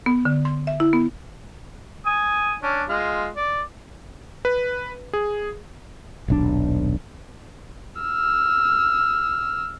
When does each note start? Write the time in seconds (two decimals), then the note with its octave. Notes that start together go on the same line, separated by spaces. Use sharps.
0.06 B3
0.25 D3
0.45 C6
0.67 E5
0.80 E4
0.93 B3
2.06 G#5 D#6
2.63 C#4 D4
2.89 G#3 F4
3.36 D5
4.45 B4
5.13 G#4
6.28 D#1 B1 D4
8.01 E6 F6